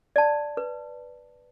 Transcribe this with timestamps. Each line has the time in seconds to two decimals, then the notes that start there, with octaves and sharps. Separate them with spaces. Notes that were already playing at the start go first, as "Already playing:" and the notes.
0.16 D5 A5
0.57 B4